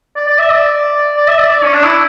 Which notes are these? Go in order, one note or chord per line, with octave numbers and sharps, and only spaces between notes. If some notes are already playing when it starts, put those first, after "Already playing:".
D5
D5
E5
D5
D5
E5
D5
D5
C#4
D4
E4